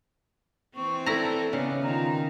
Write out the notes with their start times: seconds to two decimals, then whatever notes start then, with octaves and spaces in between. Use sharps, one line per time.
0.74 E3 C4 C#6
1.06 E4 A4 D5 A#5
1.53 C#3 B3 D#4 D5
1.82 D#3 F4 A#5